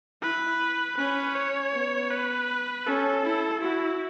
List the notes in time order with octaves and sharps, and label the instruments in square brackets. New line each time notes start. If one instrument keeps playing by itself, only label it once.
[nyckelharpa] E4 [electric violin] B4
[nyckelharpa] C#4 [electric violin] B4
[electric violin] C#5
[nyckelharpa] B3
[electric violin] B4
[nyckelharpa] C#4 [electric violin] A4
[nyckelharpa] E4
[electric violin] E4 [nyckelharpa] F#4